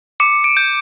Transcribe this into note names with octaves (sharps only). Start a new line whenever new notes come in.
D6 C#7
D7
G6